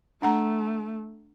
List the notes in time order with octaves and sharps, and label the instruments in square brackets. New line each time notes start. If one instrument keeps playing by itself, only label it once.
[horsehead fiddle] A3 [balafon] D4 F#5 A#5